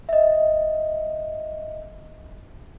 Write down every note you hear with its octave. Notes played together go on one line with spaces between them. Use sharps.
D#5 E5